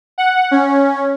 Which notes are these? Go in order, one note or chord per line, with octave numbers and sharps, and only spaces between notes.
F#5
C#4